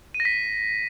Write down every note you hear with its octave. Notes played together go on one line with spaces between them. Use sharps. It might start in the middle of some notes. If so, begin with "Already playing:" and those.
D#7
A#6
B6